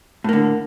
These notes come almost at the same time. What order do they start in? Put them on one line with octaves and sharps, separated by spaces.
A2 A#3 D3